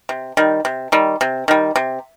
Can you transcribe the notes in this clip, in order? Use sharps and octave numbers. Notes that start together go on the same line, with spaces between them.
C3
D#3 G3
C3
D#3 G3
C3
D#3 G3
C3